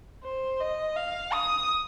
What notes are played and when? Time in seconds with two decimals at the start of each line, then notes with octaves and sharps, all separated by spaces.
0.24 C5
0.60 D#5
0.96 F5
1.33 D#6